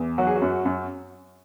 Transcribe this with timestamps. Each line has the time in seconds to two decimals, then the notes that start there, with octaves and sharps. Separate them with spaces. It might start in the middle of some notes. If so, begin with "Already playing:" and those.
Already playing: E2
0.18 F#3 F#4
0.27 G#4
0.36 F#4
0.42 F#2
0.65 F#2